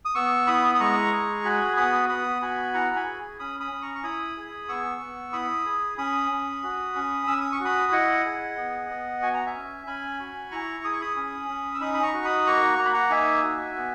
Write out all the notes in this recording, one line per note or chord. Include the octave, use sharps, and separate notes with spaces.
D#6
B3 C#6 E6
E4 B5 D#6
D#6
G#3 A#5 C#6
G#4
F#4 G#5 B5
B3 B5 D#6
B3 B5 D#6
F#4 G#5 B5
E4 F#5 A#5
G#5 B5
G#4
C#4 B5 D#6
B5 D#6
C#4
A#5 C#6
C#6
E4 B5 D#6
G#4
B3 C#6 E6
B3
E4 B5 D#6
G#4
C#4 B5 D#6
C#4
F#4
C#4
C#4 E6
D#6
C#6
F#4 B5 D#6
E4 D#5 F#5
G#4
B3
B3
F#4 G#5
A#5
E5 G#5
C#4
C#4 G#5 B5
F#4
E4 A#5 C#6
G#4 D#6
C#6
B5 D#6
C#4
C#4
E6
D#4 B5 D#6
B5
A#5 C#6
F#4
B5 D#6
A#3 A#5 C#6
A#3 A#5
B5
F#5 A#5
D#4 E5 G#5
F#4
B3